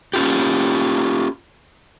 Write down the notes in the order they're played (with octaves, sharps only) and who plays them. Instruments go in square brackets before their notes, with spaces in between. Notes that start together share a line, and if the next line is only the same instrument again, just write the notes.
[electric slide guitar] C#4 F4 G4